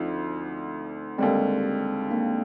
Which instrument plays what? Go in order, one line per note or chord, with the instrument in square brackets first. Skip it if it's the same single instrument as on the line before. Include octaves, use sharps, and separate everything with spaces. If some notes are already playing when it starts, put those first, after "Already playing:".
Already playing: [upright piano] D2 D3 F3 [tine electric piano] C4 D#4
[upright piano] D#2 D3 G3 [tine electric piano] G#3 C4
[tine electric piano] A#3 D4